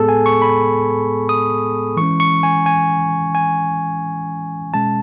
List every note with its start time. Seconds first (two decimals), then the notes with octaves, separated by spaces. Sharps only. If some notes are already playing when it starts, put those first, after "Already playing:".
Already playing: A2 G#3 B3 G#4 A4
0.09 G#5
0.26 C#6
0.42 B5
1.29 D#6
1.97 E3 G#3 C#4 C#6
2.20 C#6
2.43 G#5
2.66 G#5
3.35 G#5
4.74 B2 G#3 C#4 A5